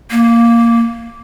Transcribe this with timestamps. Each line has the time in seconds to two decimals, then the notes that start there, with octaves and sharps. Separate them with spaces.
0.11 A#3